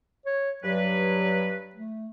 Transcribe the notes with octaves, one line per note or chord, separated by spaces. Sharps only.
C#5
G2 F#3 B4
A3